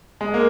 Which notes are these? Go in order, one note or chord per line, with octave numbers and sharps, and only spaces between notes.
G#3
A#3